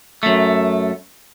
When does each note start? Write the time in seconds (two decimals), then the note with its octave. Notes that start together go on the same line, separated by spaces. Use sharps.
0.23 F#2 A3